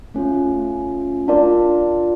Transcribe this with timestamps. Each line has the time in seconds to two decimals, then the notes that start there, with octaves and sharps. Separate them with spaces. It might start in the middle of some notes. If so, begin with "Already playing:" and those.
0.14 A3 C#4 F4
1.28 D4 F4 A#4 D5